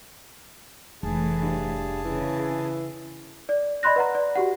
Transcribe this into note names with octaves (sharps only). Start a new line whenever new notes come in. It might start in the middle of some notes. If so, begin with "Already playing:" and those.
F1 A2 E3 G#4 A5
G2
C#3 E3
D5
D5 D#5 B5 C6 F#6 A#6
B4 F#5 A#5
D5
F#4 G4 F#5